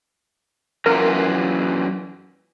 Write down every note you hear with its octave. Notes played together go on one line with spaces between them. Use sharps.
F#2 E3 F4 A#4